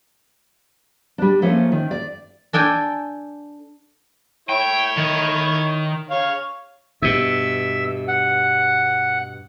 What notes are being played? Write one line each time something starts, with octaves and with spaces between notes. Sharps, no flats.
G3 D4
F3 A3 A#3 C#4
D#3
D5
D4 A4 G5 G#5
E4 C#5 G5
D#3
C#5 F5
G2 B2 E5 E6
F#5